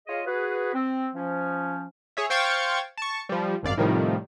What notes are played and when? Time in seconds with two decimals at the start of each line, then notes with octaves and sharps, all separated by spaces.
0.07 F4 G#4 C#5 D#5
0.26 F#4 G#4 B4
0.74 C4
1.14 F3 C#4
2.17 G#4 C#5 E5
2.30 C5 F5 G5 C#6 G#6 A6
2.97 A5 C#6
3.29 F3 G3
3.63 G#1 F#2 D5 F5
3.77 A2 C3 D#3 F3 G3